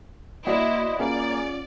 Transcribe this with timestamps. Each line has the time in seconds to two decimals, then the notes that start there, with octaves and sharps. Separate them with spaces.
0.47 A#3 E4 F#4 A#4 C5 D5 D#5 F#5
0.99 A#3 C#4 F4 G#4 D5 F#5